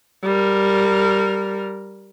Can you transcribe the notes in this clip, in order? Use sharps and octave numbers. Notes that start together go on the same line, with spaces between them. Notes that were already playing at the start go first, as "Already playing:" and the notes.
G3 A#4